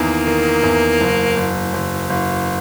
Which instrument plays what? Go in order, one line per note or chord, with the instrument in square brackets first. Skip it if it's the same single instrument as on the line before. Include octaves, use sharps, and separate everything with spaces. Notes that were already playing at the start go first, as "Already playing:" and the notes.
Already playing: [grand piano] E2 D#3 [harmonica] A#3
[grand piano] D#3
E2
F#1
F#1
F#1
F#1